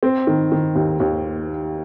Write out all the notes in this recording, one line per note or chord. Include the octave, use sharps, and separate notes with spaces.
C4
D#3
D#3
D#2
D#2